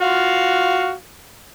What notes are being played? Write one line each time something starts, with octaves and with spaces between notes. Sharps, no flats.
F4 F#4 F5